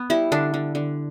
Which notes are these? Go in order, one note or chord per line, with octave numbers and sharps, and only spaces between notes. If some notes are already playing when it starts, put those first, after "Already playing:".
Already playing: B3
G3 E4
D3 D4
D3
D3